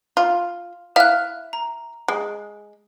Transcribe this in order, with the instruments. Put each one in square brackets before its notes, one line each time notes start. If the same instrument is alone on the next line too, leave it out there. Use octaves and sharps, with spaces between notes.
[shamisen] F4
[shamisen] E4 E5 F5 [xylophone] F6 F#6
[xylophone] A#5
[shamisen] G#3